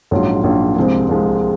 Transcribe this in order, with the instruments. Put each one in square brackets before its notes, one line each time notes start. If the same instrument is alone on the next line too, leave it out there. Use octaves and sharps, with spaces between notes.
[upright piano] A#1 G#2 F#3 C#4 F4
A#1 G#2 F#3 C#4 F4
C2 C3 F3 G#3 C4
C2 C3 F3 G#3 C4